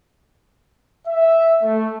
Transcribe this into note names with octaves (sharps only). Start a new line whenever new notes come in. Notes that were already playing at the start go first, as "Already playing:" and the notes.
E5
A3